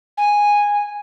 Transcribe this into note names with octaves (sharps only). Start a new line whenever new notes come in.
G#5